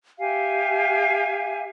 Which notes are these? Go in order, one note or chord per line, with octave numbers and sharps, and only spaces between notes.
G4 E5 F5 G#5